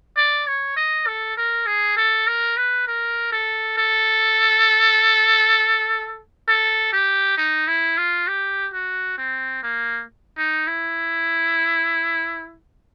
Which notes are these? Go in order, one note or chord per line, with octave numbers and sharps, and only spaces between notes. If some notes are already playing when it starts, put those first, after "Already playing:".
D5
C#5
D#5
A4
A#4
G#4
A4
A#4
B4
A#4
A4
A4
A4
G4
D#4
E4
F4
G4
F#4
C4
A#3
D#4
E4